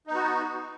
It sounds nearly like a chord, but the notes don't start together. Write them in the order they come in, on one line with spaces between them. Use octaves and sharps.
D#4 B3 F#4